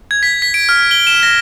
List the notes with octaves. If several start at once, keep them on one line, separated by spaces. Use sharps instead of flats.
G#6
B6
B6
D7
F6
G7
E7
A#6